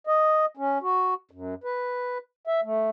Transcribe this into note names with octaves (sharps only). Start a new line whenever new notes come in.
D#5
C#4
F#4
F#2
B4
E5
A3